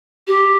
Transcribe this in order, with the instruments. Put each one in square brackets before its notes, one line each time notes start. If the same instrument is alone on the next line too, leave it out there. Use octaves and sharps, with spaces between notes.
[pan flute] G4